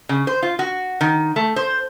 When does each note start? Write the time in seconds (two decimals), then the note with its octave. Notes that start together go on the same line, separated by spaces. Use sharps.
0.09 C#3
0.27 C5
0.42 F4
0.59 F#4
1.01 D#3
1.36 A3
1.56 C5